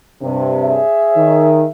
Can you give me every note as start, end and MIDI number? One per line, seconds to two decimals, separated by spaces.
0.22 0.80 43
0.22 0.80 48
0.60 1.70 68
0.60 1.70 73
0.60 1.70 76
1.17 1.64 51